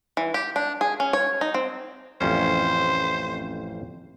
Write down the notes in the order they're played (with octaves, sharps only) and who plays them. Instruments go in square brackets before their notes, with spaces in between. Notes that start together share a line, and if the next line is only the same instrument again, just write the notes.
[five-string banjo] E3
G4
D4
G#4
C#4
C#5
D#4
C4
[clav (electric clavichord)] A1 F2 C#4 [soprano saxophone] C5